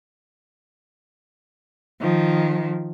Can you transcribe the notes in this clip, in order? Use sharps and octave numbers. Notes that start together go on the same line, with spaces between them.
D#3 F3